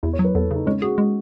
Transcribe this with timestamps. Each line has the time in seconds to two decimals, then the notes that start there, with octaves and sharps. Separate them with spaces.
0.03 E2 E4
0.13 C#5
0.19 F#3
0.24 B4
0.35 E2 A4
0.51 C#3 D#4
0.67 G#3 C#4
0.82 F#4 G#4
0.98 G#3